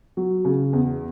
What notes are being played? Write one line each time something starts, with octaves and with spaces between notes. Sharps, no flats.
F#3
C#3
E2